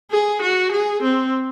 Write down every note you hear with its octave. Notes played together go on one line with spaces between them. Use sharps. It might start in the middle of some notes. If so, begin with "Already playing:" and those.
G#4
F#4
G#4
C4